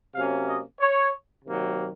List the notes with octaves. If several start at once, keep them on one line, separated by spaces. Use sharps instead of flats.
C3 F#3 A#3 C#4 F5
D#5
C#5
C3 D#3 F#3 A#3